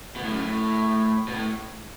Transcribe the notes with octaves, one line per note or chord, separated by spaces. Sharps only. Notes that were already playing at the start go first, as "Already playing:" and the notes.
B2
A2
F#2
A2
B2
A2